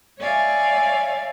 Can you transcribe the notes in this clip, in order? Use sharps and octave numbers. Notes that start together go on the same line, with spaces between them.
C#5 D5 E5 F5 G#5